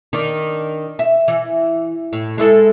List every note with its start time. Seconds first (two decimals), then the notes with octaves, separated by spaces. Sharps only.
0.13 D#3 D4
0.99 E5
1.28 E3
2.13 A2
2.38 G#3 E4 A4